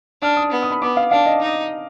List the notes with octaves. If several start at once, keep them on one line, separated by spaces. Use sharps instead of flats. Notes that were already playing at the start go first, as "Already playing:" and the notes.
D4 F6
D#6
B3
D#6
B5
B3 D6
F5
D4 F5
D#5
D#4